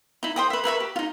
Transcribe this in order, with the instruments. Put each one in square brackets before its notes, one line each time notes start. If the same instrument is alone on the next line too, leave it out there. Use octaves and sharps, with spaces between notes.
[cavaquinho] D#4 E4
C5 G5 D#6
B4 E5
A#4 B4 E5 C#6
G4
D#4 F4